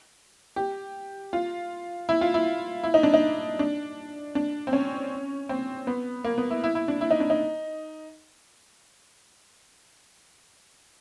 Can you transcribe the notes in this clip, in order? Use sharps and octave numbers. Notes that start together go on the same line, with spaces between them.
G4
F4
E4
F4
E4
E4
D#4
D4
D#4
D4
D4
C4
C#4
C4
B3
A#3
B3
E4
E4
E4
D4
E4
D#4
D4
D#4